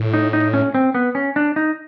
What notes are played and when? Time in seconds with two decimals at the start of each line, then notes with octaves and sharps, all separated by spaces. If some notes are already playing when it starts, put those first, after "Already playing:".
Already playing: A2
0.14 D#4
0.33 D#4
0.54 C#4
0.75 C4
0.95 B3
1.15 C#4
1.36 D4
1.56 D#4